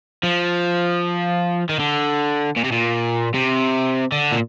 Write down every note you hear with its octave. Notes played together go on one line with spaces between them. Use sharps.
F3
D#3
D3
A#2
C3
A#2
C3
D3
A#2